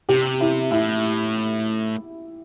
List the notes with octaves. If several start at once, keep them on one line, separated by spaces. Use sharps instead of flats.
C3 G4
E4
A2 E4